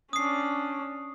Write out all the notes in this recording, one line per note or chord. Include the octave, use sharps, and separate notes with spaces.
C#4 D4 D#6 C7